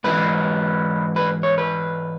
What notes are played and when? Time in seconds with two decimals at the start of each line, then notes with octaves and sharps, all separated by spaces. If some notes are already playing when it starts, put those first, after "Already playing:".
0.04 G#2 E3 B4
1.16 B4
1.43 C#5
1.58 B4